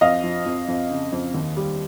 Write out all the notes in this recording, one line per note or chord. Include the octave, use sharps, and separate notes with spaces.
F2 D#5 F5
F3
F2
F2
C#3
F2
D#2
G3